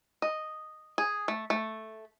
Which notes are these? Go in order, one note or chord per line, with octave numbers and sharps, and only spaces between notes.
D#5
G#4
A3
A3